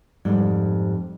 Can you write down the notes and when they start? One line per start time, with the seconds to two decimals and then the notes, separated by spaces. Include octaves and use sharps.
0.25 F2 G#2 G3